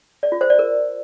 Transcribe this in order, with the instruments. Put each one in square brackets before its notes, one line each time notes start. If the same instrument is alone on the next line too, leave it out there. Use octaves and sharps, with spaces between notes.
[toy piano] D5
F4
C5
D5
A#4